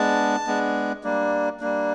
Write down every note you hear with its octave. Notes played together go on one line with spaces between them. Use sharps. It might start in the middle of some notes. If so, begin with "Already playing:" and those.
Already playing: G#3 B3 D4 A5
G#3 B3 D4
G3 A#3 D4
G3 A#3 D4